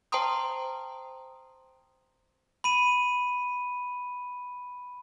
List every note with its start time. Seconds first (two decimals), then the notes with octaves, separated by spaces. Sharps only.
0.12 C5 G5 A5 A#5 C6 D#6
2.64 B5 D#7